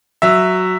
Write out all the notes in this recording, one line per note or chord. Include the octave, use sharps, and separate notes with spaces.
F#3 E5